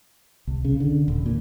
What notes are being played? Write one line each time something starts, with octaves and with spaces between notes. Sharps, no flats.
C2
C#3
D3
D#1
A#2